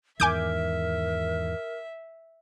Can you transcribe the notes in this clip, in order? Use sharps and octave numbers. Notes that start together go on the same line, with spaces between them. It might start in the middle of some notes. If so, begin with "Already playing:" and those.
E2 G#2 D#3 A#4 E5 G#5 D6 G6